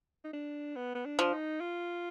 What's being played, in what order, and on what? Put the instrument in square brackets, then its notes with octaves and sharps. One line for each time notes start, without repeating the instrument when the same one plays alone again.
[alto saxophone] D#4
D4
B3
B3
D4
[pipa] F3
[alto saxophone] D#4
F4